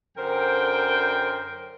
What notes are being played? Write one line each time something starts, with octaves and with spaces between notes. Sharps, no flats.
F#2 D3 A#4 C5 G5